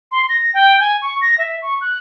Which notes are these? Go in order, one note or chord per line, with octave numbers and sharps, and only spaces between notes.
C6
A#6
G5
G#5
C#6
A#6
E5
C#6
F#6